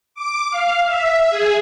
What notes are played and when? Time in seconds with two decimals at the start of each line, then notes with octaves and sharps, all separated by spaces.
0.14 D6
0.51 F5
0.85 E5
1.30 G#4